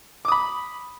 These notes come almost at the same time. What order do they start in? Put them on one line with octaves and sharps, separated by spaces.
D6 D#6 B5